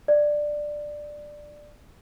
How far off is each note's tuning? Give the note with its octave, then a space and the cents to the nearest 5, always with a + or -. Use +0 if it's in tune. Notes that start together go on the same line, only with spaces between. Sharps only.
D5 +10